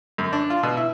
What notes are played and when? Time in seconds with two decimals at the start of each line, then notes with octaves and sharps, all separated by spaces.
0.18 F#2
0.33 D4
0.50 F4
0.63 B2
0.77 E4